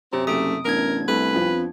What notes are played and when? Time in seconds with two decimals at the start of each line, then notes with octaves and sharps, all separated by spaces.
0.13 F#2 C3 C4 C#4 G4 A#5
0.27 F#1 A3 D#6 D7
0.65 A1 B3 D4 A#4 G#6
1.08 C2 A3 B4
1.34 F2 F3